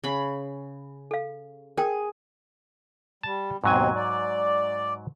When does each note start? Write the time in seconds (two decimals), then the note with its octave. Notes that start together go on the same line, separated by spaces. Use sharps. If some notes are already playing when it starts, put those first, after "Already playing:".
0.04 C#3 B5
1.11 A4 F5
1.77 G#4 A#4 G5
3.23 G3 A5
3.64 D#2 G#2 B2 F#3 C4 G#5
3.95 D5